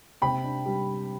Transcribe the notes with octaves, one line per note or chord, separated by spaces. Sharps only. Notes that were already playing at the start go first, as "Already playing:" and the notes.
C3 G5 B5
D4
G3